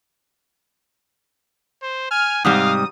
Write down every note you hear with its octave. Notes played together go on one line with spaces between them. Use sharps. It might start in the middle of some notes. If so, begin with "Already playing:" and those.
C5
G#5 F6
G#2 C3 G3 F5 D#6